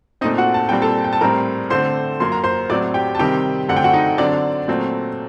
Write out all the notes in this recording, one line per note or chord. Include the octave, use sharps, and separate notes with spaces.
A#2 A3 C4 D#4 D#5
F#4 F#5
A5
A#2 G3 C4 G5
A4 A5
G5
A5
A2 G3 C4 A#4 A#5
D3 A3 C4 C5 C6
F#2 F#3 A#3 C6
A#5
C5 C6
A2 F#3 C4 D5 D6
G4 G5
A5
C3 D#3 G3 C4 G4 G5
F#2 D3 A3 C4 F#5
G5
F#4 F#5
D#4 D#5
D3 F#3 C4 D4 D5
A#2 F#3 A3 C4